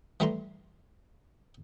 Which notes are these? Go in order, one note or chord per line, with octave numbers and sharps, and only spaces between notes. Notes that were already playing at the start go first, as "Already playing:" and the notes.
E3 G3 A3 E4 A#5 C6